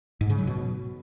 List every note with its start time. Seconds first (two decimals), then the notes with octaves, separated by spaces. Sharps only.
0.21 G#2
0.30 C#3
0.38 F#3
0.47 B2